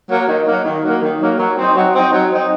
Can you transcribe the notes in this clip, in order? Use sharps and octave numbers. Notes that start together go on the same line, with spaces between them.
F#3 A#3
D#3
F#3 A#3
D#3
F#3 A#3
D#3
F#3 A#3
F#3
C4 D#4
F#3
C4 D#4
F#3
C4 D#4